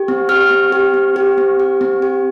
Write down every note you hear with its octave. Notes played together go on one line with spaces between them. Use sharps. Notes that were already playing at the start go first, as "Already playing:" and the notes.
Already playing: G4
C4
G4 F6
C4
G4
C4
G4
C4
G4
C4
G4